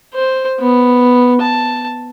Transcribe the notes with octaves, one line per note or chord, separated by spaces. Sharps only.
C5
B3
A5